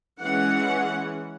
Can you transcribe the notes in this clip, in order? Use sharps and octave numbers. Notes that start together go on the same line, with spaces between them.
E3 G#3 C#4 F#5